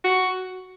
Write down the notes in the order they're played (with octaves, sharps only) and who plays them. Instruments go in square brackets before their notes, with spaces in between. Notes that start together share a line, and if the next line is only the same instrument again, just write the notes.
[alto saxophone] F#4